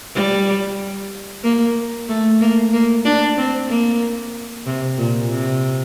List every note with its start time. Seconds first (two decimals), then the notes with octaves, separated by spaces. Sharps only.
0.15 G3
1.44 A#3
2.08 A3
2.41 A#3
2.73 A#3
3.05 D4
3.38 C4
3.69 A#3
4.66 C3
4.98 A#2
5.31 C3